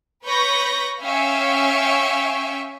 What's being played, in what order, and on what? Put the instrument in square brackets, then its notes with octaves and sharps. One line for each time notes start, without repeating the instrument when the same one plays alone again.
[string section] B4 C#5 B5 C#6 G6 A#6
C#4 E5 F5 G5 G#5 C#6